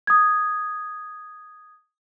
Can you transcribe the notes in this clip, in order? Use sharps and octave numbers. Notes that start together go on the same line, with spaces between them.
D#6 G#6